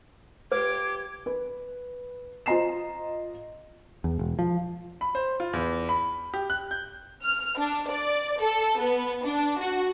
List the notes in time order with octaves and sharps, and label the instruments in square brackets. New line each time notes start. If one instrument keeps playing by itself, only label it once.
[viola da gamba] F4 G4 [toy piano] B4 [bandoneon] D6 [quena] G#6
[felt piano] B4
F4 C5 D#5 A#5 C7 E7
[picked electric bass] E2
E1
F3
[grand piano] B5
C5
F4
E2
B5
G4
F#6
G6
[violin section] F6
D4
D5
A4
B3
D4
F#4